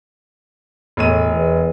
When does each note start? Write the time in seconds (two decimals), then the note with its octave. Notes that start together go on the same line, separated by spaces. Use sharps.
0.97 E1 A2 C#5 D#7
1.33 E2